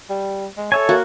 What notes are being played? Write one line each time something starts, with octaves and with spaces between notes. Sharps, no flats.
G3
G#3
A4 C#5 E5 G#5
A#3 F#4